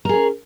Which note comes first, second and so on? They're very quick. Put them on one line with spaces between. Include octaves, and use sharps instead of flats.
A#4 G#4 C#4